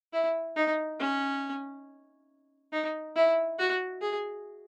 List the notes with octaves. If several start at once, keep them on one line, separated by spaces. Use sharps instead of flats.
E4
D#4
C#4
D#4
E4
F#4
G#4